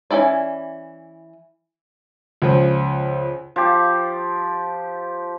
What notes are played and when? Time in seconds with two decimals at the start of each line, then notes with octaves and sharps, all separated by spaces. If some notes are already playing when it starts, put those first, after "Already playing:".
0.11 E3 C#4 E4 D5
2.42 C#2 F3
3.56 F3 G4